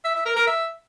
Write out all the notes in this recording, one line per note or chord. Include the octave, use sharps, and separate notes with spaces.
E5
E5
A#4
A#4
E5